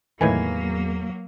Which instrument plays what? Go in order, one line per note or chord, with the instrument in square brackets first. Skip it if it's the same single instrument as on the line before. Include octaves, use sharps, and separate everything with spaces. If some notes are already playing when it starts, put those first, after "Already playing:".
[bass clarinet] E2 [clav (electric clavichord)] A2 D#3 E3 [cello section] F#3 A#3 [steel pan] B4 G#5